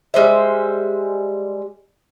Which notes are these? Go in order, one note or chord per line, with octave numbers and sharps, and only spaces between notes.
G3 G#3 C5 E5